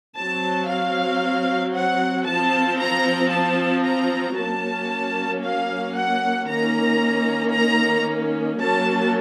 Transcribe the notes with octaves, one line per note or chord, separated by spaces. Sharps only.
F#3 C4 A5
F5
F#5
F3 C4 A5
A#5
A5
A#5
F#3 A#3 C#4 A5
F5
F#5
D#3 A#3 C#4 A#5
A#5
F#3 A#3 C#4 A5